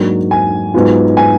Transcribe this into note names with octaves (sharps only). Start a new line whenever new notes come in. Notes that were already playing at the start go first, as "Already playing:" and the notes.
Already playing: G#2 F#3 A#3 D4
G#5
G#2 F#3 B3 F4
G#5